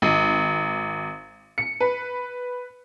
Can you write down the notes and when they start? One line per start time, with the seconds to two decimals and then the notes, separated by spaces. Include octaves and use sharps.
0.02 G#1
1.58 C#7
1.80 B4